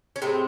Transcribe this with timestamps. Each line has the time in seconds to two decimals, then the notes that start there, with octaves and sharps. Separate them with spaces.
0.16 C#4
0.22 A2 C3 G#3 C4